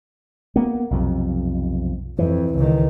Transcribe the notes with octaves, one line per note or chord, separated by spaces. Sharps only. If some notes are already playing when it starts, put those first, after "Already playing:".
A#3 B3
B1 F2 C3
F2 E3
C#2 D#3